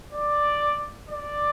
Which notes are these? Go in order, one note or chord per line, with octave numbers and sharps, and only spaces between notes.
D5
D5